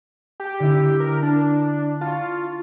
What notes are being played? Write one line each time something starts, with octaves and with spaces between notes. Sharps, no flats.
G4
D3 E4
A#4
D4
F4 A5 C#6